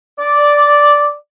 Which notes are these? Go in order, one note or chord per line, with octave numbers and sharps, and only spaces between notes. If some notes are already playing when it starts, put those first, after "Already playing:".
D5